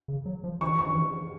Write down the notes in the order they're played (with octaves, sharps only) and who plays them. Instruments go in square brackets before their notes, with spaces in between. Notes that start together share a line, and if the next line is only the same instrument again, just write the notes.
[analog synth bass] C#3
F#3
F3
[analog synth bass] E3 [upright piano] C#6
[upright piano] C#6
[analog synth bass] E3